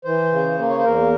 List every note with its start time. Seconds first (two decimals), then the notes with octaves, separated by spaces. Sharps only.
0.05 E3 C5
0.32 C#3
0.58 A#3
0.69 C#5
0.78 C5
0.85 E2 A#4